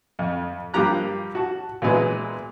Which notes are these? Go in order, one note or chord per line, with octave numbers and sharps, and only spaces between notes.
F2
G2 F3 A#3 G4 A#5 F#6
F#4 A5
A#2 E3 F#3 G#3 B3